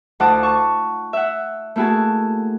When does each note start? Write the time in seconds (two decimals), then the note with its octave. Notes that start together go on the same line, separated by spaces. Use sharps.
0.20 D2 D#4 F4 F#5 A5 D6
0.43 A5 C#6
1.13 E5 F#5
1.76 A3 A#3 E4 F#4 G#4 A5